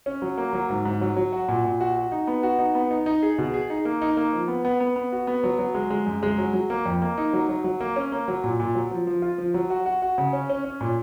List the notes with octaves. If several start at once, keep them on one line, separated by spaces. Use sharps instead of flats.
C#4
F#3
A#3
F#3
G#2
G#2
F#3
F#3
F#4
A#2
A#2
F#4
F#4
D#4
B3
F#4
D#4
B3
D#4
D#4
G#4
B2
G#4
D#4
A#3
D#4
A#3
F3
B3
B3
B3
B3
F#4
B3
F#3
F#3
G#3
G#3
F#2
G#3
F#3
F#3
A#3
F2
A#3
D#4
F#3
F#3
F#3
A#3
C#4
A#3
F#3
A#2
A#2
F#3
F3
F3
F4
F3
F#3
F#4
F#4
F#4
C#3
C#4
C#4
C#4
A#2